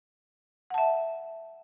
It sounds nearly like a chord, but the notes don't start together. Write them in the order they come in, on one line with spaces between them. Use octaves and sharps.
F#5 A5 E5